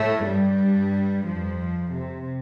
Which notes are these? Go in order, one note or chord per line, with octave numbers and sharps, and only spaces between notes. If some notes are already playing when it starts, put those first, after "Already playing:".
Already playing: A2 A3
G2 G3
F2 F3
C3